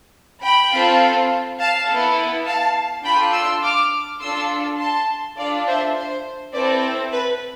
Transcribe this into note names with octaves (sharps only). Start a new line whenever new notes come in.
G5 B5
C4 F4 A4
F5 A5
B3 E4 A4
F5 A5
D4 F4 A4 G5 B5
C6 E6
D6 F6
D4 F4 A4 C6 E6
A5 C6
D4 F4 A4 D5 F5
C5 E5
C5
C4 E4 A4 B4 D5
B4